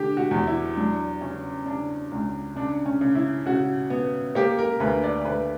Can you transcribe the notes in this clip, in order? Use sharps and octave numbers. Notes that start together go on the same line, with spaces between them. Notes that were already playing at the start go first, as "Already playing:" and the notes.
Already playing: D3 G4
F#4
E2
E4
F#3 D4
C#3 C#4
C#3 D4
C#2
C#3 D4
C#4
C#3
E4
C#3 F#4
B3
A#3 G4
A#4
D2 B4
D5
D2 B4